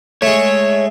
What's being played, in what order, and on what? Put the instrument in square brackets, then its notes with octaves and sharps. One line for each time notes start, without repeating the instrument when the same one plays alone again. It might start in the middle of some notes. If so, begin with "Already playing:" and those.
[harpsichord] G#3 A3 [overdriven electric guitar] C#5